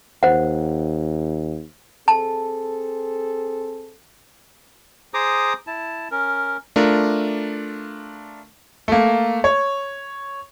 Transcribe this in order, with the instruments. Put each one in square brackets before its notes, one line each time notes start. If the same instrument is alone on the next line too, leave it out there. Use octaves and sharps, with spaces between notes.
[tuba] D#2 [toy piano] C5 F#5
[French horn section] C4 G#4 A4 [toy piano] A5
[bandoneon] G#4 C5 A#5 D6 D#6
E4 A5
C#4 A#4
[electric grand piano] A3 D4 F4 A#4
[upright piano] A3 A#3
C#5